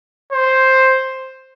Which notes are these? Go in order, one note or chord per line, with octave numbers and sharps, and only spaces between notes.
C5